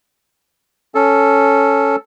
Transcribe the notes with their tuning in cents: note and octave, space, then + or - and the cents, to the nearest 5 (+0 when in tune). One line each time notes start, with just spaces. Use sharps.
C#4 +0 A4 +0